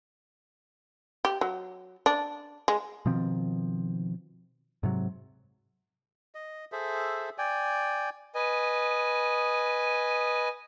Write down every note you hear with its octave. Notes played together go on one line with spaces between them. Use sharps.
G4
F#3
D4
G#3
B2 D#3 F3 C4
G#2 C3 F#3
D#5
G#4 A4 C5 E5
D5 G5 G#5
B4 D#5 G#5